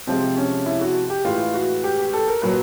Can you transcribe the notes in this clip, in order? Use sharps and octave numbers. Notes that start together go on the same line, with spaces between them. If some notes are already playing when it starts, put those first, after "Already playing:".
C3 F3 G#3 C4
C#4
E4
F#4
G4
A2 E3 G#3 F4
F#4
G4
G4
A4
A#4
A#2 F#3 B4